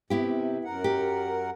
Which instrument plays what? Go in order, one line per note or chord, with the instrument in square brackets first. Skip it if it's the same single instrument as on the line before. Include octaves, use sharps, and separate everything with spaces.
[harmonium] C3 [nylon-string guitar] B3 E4 G4
[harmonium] F#2 A#4 F#5
[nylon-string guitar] G4